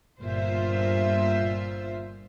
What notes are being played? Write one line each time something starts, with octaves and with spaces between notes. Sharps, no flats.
G1 A#2 F4 C5 E5